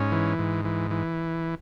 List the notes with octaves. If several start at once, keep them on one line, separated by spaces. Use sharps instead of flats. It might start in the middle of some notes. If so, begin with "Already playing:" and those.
Already playing: G#2 C#4
E3
G#2
E3
E3